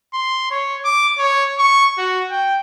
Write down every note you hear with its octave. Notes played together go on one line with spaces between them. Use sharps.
C6
C#5
D6
C#5
C#6
F#4
G5